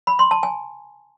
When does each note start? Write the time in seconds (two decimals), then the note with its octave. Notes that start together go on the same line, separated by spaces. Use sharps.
0.07 B5
0.19 C6
0.31 A5
0.43 G#5